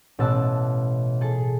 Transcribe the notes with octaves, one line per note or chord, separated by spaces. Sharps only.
A1 B2 F#5 A5 E6
G#4 A4